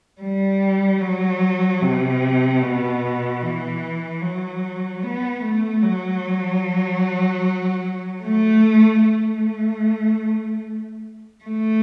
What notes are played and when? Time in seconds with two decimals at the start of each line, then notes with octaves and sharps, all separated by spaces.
0.22 G3
1.01 F#3
1.82 C3
2.62 B2
3.42 E3
4.22 F#3
5.03 B3
5.43 A3
5.83 F#3
8.23 A3
9.04 A3
11.45 A3